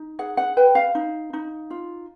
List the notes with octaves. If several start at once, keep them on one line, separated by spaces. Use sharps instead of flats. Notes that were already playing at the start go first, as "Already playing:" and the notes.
Already playing: D#4
G#4 F#5
F#5
B4 G5
F5
D#4
D#4
F4